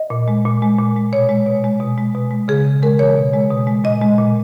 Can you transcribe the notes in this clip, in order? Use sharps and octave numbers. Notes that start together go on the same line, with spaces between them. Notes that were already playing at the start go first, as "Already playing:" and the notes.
Already playing: D#5
A#2
G#3
A#2
G#3
A#2
G#3
B2 C#5
G#3
B2
G#3
B2
G#3
B2
G#3
C#3 G#4
C#3
G#3 A#4
E3 C#5
B2
G#3
B2
G#3
A#2 D#5
G#3
A#2